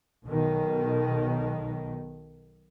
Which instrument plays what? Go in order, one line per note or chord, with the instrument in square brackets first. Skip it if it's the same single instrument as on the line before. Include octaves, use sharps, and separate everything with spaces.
[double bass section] B1 B2 D#3